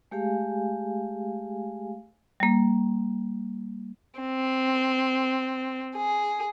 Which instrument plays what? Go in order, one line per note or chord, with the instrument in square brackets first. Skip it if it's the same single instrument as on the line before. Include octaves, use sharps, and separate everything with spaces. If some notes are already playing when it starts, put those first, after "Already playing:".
[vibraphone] G#3 A3 G4 G#4 F5 G#5
[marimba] G3 A#3
[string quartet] C4
G#4